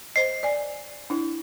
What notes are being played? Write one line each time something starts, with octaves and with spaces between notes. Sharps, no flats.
C5 D#5 C7
D5 G#5
D4 E4